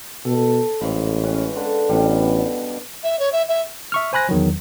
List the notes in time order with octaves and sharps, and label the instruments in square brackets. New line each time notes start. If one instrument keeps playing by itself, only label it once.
[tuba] B2 [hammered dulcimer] A4
[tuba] A1 [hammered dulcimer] G#2 F5 B5
[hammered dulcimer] C#4 B4
D3
[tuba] A1 [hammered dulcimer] B2 G3
[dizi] E5
C#5
E5
E5
[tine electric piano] E5 C#6 F6
C5 G#5 B5 F#6 A#6
E2 D#3 F#3